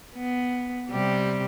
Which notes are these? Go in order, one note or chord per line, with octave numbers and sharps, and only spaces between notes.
B3
C3 G3 G4